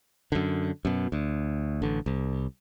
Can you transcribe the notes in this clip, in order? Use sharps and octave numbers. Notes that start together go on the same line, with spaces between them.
F#2 D3
F#2 B2
D2
A1 D3
C2